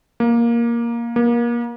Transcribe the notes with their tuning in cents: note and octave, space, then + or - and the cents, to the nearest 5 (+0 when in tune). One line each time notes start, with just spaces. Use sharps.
A#3 +10
A#3 +30